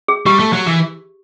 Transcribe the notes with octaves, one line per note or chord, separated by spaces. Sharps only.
G#4
G3 G4
A3
F#3
E3